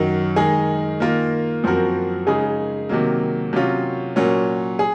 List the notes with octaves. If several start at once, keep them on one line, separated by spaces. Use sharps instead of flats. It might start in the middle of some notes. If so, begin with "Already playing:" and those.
Already playing: F#2 D#3 F#3
D#3 G#3 D#4 G#4
D#3 A#3 F4 A#4
F#2 F3 C4 F#4 A#4
C#3 G#3 D#4 G#4
C3 D#3 F#3 A#3
C3 F#3 C#4 F4
A#2 F#3 C#4
G#4